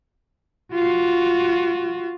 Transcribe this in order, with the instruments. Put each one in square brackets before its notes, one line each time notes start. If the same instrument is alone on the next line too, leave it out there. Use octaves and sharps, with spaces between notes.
[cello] F4 F#4